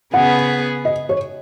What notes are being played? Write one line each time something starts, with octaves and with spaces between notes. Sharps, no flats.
C#3 B3 G#4 B4 F#5
D#5
C#5